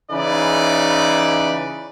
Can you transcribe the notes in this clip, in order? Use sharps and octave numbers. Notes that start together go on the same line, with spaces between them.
C#3 E3 D#4 B4 D5